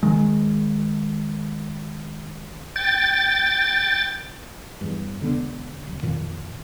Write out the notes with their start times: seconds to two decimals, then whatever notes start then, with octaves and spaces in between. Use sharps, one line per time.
0.03 D#3 G#3
2.76 G5 A6
4.81 E2 G2
5.21 E1 D3 B3
5.87 D1
6.03 F2 A#2 D#3